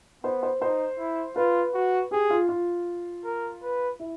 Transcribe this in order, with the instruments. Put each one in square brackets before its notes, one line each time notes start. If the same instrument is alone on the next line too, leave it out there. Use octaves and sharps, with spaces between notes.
[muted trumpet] B3 [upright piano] C5
[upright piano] C5
[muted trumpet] D#4 [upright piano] C5
[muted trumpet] E4
[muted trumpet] F4 [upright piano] B4
[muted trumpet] F#4
[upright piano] G4 [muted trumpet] G#4
[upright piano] F4
F4
[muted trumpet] A#4
B4
[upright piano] E4